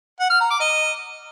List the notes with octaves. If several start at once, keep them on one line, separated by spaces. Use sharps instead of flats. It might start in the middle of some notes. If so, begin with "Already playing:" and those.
F#5
F6
A#5
D6
D#5